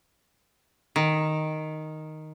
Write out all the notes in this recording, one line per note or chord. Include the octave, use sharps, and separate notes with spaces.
D#3